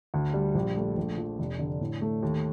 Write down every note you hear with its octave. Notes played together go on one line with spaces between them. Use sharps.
D2
G3
A#1
A3
A#1
F3
F1
D3
A2
A3
D#2